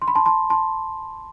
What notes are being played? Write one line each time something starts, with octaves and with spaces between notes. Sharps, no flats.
C6
B5
A5 C6
A5 C6
A5 C6